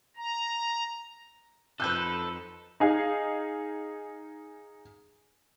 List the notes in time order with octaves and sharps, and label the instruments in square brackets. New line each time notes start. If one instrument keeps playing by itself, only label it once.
[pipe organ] A#5
[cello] F2 [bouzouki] D#4 B4 [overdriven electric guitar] A4 [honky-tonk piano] F#6 G6
[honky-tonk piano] D#4 G#4 F5